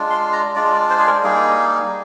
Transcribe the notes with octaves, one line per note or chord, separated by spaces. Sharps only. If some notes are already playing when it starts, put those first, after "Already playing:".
Already playing: G#3 D4 F4
C6
A#5
G#3 D4 F4 D5
D5
C5
G#4
A#4
G3 A#3 D#4 G#4